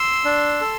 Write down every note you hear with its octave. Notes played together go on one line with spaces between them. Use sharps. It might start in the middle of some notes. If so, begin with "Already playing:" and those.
Already playing: C6 E6
D4
A4